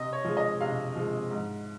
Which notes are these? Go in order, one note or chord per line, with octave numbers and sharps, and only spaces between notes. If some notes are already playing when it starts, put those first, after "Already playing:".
Already playing: C3 D#5
C#5
F3 G#3
D#5
C3 F5
F3 G#3
G#2